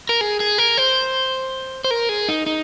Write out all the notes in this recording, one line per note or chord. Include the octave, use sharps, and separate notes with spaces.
A#4
G#4
G#4
A#4
C5
C5
A#4
G#4
D#4
D#4